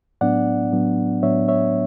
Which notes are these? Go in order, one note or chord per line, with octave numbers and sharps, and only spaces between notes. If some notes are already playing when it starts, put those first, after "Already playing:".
A2 F#3 B3 D4 D5 F#5
A2 F#3 B3 D4
A2 F#3 B3 D4 C#5 E5
C#5 E5